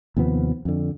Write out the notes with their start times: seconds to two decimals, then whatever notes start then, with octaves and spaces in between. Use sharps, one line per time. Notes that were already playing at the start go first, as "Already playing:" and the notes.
0.17 D#2 C3 F3 B3
0.65 F2 D3